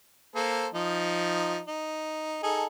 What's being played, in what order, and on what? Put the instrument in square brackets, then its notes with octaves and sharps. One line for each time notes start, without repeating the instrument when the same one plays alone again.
[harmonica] A#3 A4 C5
F3 D#4
D#4
D#4 G#4 A4